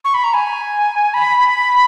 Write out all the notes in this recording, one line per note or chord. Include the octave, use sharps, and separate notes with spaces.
C#6
B5
A#5
G#5
B5